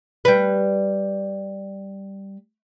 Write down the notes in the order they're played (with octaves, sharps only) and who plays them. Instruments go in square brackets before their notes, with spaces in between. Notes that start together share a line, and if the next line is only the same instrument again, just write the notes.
[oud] G3 B4